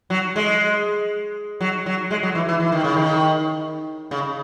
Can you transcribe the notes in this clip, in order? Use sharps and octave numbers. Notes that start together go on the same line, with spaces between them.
F#3
G#3
F#3
F#3
G#3
F#3
E3
E3
E3
D#3
C#3
D#3
C#3